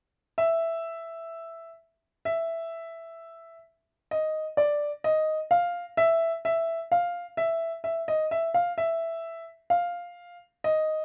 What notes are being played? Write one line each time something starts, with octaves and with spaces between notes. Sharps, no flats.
E5
E5
D#5
D5
D#5
F5
E5
E5
F5
E5
E5
D#5
E5
F5
E5
F5
D#5